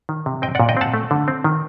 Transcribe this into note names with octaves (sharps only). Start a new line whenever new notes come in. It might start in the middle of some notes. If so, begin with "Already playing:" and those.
D#3
C3
C4 D#5 G5
D5 F#5
A#2
D#5 G5
C4 F#5 A5
A3
D3
C4
D#3